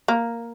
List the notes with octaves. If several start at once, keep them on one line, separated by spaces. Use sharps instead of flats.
A#3